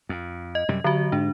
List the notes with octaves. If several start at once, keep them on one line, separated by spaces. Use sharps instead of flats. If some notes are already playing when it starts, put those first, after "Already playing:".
F2
D#5
F#2 C3 G3
D3 F#3 F#4
G#2 D4